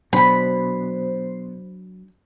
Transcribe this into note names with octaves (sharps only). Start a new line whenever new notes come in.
B2 F#3 D4 C5 B5